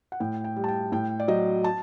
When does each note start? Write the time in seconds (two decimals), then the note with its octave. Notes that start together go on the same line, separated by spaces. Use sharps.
0.12 F#5
0.20 A2 G5
0.44 G5
0.56 G3
0.64 A5
0.68 G5
0.92 A2 G5
1.20 D5
1.28 F#3 D#5
1.64 A5